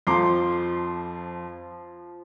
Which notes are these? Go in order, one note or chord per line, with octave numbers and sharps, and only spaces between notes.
F2 F3 A#5 C6 D6